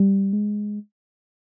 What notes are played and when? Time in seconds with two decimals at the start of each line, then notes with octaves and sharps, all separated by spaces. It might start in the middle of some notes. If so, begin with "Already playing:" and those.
Already playing: G3
0.33 G#3